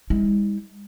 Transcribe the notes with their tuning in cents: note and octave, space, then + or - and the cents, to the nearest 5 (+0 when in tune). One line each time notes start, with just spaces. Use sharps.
G#3 -40 E4 -45